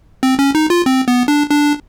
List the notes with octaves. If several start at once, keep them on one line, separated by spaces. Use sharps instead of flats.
C4
C#4
D#4
F4
C4
B3
D4
D4